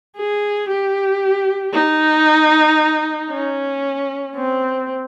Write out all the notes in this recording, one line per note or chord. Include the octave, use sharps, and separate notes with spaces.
G#4
G4
D#4
C#4
C4